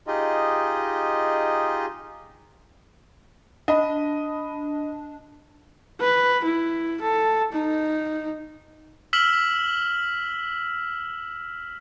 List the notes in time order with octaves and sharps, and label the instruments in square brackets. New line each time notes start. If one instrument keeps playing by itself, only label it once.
[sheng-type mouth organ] D#4 F4 G4 G#4 D#5
[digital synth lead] D4 [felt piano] D#5 B5
[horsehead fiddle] B4
E4
A4
D#4
[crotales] E6 F6 B6 E7 F#7